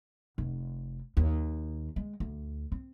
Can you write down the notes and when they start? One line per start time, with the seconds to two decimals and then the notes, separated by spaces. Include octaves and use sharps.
0.38 F1
1.17 D#2
1.96 G#3
2.20 D2
2.72 C4